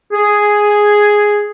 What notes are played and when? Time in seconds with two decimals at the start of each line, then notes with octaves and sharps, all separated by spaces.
0.13 G#4